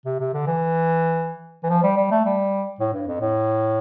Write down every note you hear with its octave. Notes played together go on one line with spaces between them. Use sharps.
C3
C3
D3
E3
E3
F3
G3
G3
A3
G3
A2
G2
F2
A2